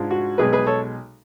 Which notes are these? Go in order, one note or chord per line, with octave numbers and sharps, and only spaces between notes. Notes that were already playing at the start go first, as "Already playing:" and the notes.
Already playing: G#2 G#3 D4 F4
F#4
B1 B2 G#3 G#4 B4
G#4 B4
A4 C#5